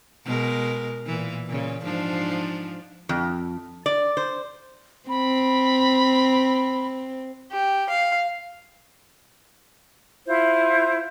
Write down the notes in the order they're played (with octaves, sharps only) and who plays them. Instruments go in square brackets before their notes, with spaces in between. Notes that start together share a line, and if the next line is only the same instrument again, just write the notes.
[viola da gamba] B2 G#3 A#4
A#2 E3
A#2 C#3
G#2 F3 D4
[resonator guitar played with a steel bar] F2
D5
C5
[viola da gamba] C4 [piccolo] B5
[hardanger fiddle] G4
F5
[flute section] E4 F4 C5 E5